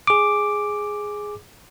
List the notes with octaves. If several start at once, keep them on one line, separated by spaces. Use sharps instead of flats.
G#4 D6